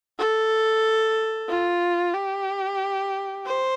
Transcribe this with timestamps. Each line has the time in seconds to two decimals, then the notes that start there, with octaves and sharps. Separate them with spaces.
0.18 A4
1.49 F4
2.14 G4
3.46 C5